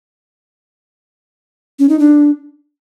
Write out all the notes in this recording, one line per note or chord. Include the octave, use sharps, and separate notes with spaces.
C#4
D#4
D4